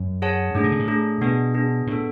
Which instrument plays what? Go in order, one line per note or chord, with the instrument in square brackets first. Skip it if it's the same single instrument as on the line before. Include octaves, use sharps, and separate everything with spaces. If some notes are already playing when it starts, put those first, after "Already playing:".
Already playing: [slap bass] F#2
[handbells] G#4 C#5 F#5 A5
[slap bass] G#2 [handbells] A3 D4 G#4
[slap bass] B2
C#3
A2
[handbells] A3 D4 G#4
[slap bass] B2 [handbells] B3 D4 G#4
[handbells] B3 D4 G#4
[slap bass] A2 [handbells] B3 D4 A4